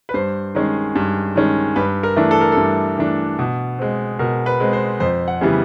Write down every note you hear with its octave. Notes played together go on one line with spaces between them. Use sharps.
B4
G2 C5
D#3 G#3 C#4
G2
D#3 G#3 C#4
G2 B4
A#4
E3 A3 D4
A4
A#4
G2 A4
E3 A3 D4
B2
G#3 C4
B2 A#4
B4
G#3 C4
C5
F2 C5
F#5
C#3 E3 G3 B3